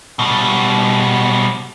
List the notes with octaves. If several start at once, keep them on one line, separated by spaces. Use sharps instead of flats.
B2 G3